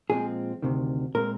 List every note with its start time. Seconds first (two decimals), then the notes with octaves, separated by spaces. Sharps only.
0.10 A#2 F3 G#3 C4 G#4
0.62 D2 C3 D#3
1.15 A#2 G#3 C4 A#4